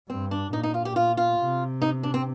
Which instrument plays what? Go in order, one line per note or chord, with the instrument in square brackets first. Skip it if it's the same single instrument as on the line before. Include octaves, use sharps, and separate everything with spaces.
[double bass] G2 [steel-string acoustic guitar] C4
[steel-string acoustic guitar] D4
[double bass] A#2 [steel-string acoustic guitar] D#4
[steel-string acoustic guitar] D#4
F4
G4
F4
F4
[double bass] C3
[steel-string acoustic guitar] D#4
D4
C4